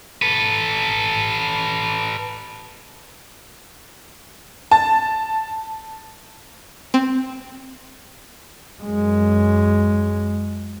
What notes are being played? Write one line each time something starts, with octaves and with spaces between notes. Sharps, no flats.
A4 B4
A5
C4
F#2 G#3